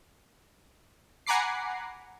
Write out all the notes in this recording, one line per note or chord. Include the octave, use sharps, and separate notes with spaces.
F#5 G#5 A#5 B5 D6 C7